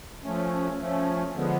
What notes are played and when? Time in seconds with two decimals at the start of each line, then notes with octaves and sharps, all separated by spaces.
0.24 F3 A3 C#4
0.79 F3 A3 C#4
1.35 D3 F3 G#3 B3